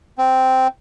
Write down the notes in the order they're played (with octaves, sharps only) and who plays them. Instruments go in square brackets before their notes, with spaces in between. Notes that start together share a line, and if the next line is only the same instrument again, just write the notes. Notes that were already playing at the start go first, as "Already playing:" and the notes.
[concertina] C4